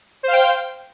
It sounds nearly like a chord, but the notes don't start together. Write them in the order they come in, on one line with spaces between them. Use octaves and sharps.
C5 F5 G5